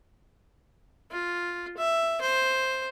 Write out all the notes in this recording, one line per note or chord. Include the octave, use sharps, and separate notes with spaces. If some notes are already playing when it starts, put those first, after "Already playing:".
F4
E5
C5